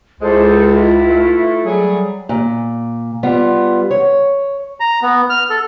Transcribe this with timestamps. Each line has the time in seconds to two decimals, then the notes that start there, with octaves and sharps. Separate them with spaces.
0.20 C#2 G#3 E4 A4 C5
0.71 E4 F4 B4
1.09 A3
1.65 F#3 G3 G#4
2.29 A#2
3.23 G3 B3 F4
3.91 C#5
4.80 A#5
5.02 B3
5.30 F6
5.50 A4